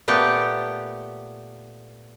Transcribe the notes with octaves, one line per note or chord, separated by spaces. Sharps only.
A#2 A3 B3 G4